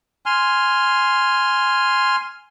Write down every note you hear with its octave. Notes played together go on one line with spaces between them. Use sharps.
G#5 C6 F6